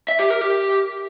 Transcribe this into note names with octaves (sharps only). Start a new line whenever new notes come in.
E5
G4
A#4
G4